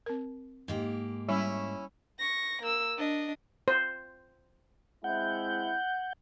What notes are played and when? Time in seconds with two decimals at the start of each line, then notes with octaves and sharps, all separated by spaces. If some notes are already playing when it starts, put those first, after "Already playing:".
0.06 C4 A#4
0.68 G#2 A#3 G4
1.29 G3 C#4 E4
2.19 C#6 A#6
2.62 A#3 E6
2.98 D4 D#5
3.68 C5
5.04 G#3 C4 E4 F#5 G6